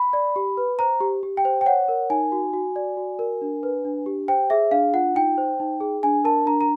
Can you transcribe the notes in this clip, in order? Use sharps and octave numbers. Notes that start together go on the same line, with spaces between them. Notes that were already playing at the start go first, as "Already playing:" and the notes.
Already playing: B5
D5
G4
B4
C5 A#5
G4
G4
G5
C5
G5
C#5 F#5
A#4
D#4 G#5
F#4
F#4
D5
F#4
A#4
D4
B4
D4
G4
C5 G5
G#4 E5
D4 F5
F4 F#5
D#4 G5
C5
D#4
G#4
D4 G#5
A#4 A5
D4 A#5
A#5